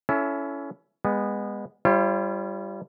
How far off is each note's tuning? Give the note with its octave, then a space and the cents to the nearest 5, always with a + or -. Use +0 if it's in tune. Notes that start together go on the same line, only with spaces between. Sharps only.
C#4 +20 E4 +15 A4 +0
G#3 -30 B3 -5
G3 +0 F4 -45 C5 +45